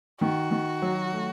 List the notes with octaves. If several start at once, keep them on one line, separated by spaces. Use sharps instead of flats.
D#3 F#4
D#3
F#3
A3